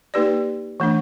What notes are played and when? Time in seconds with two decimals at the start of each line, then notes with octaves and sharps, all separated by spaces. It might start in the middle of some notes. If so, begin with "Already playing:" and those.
0.14 A#3 D#4 G4 B4 D5
0.80 E3 A3 D4